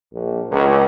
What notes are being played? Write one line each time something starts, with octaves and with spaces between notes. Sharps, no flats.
A#1
C#2